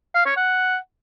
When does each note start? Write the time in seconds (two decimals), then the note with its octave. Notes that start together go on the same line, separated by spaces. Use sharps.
0.15 F5
0.26 C#5
0.37 F#5